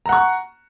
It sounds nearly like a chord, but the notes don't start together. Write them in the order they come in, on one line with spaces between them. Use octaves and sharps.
A#5 F#5 C#6